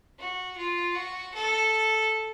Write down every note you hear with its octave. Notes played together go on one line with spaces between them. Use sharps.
F#4
F4
F#4
A4